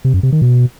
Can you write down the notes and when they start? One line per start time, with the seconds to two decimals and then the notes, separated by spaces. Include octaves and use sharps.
0.05 C3
0.14 F#2
0.23 C3
0.32 D#3
0.42 B2